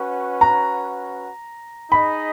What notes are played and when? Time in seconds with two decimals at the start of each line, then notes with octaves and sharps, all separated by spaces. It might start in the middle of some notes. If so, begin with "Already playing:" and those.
Already playing: C#4 F#4 B4 F#5
0.41 A#5
1.91 D#4 G#4 D#5 B5